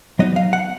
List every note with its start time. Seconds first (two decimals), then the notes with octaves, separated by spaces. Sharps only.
0.19 F#3 B3 D#4 D#5
0.36 F5
0.53 F#5